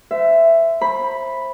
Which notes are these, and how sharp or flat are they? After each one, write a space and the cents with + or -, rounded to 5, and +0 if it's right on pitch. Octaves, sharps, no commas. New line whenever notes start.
C5 -30 E5 +10
C5 +25 B5 +0